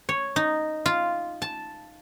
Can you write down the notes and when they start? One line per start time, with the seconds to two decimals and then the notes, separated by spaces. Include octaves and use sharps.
0.09 C#5
0.36 D#4
0.86 F4
1.42 A5